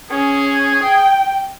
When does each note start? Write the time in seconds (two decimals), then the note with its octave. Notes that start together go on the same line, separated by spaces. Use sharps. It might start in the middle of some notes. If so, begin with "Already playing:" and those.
0.11 C#4 G#4
0.83 G5